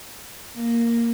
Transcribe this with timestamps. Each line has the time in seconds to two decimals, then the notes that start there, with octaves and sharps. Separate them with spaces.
0.55 A#3